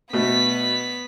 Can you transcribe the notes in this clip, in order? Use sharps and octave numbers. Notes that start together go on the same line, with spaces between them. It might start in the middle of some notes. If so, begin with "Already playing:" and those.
B2 A3 B3 B6